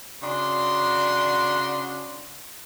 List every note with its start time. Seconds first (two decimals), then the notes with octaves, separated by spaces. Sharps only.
0.22 C#3 D4 F#4 C6